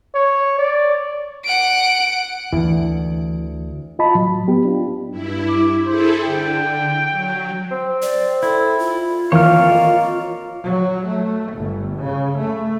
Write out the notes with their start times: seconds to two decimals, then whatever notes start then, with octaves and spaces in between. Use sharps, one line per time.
0.15 C#5
0.58 D5
1.45 F#5 D7
2.53 D2 E3
3.99 F4 D#5 A5 B5
4.15 A2 F#3
4.48 B3 G4
4.65 D4 F4
5.10 G2 E4
5.48 D6
5.86 E4 G#4 A4 C5
6.23 D3 G5
7.09 F#3
7.71 C4
8.02 D5
8.43 E4 A4
8.79 F4
9.32 D#3 E3 A#3 C4 C#5 F6
9.68 A#4 D#5
10.65 F#3
11.08 A3
11.53 G1
11.99 C#3
12.38 A3